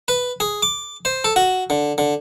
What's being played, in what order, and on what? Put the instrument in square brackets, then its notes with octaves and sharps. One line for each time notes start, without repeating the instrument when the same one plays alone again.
[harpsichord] B4
G#4
D6
C5
A4
F#4
D3
D3